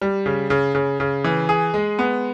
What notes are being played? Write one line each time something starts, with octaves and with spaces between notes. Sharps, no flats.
G3
C#3
C#3
C#3
C#3
E3
G#4
G#3
B3